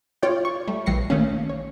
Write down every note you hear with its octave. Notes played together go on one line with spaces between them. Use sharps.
F4 C#5 D5 G5
C#6
G3 A3
A#1 E3 G3 A#6 C7 C#7
D#3 A3 A#3 C#4
C#5